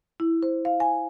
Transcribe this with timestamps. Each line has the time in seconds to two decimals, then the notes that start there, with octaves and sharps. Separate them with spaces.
0.20 E4
0.43 C5
0.65 F5
0.80 G#5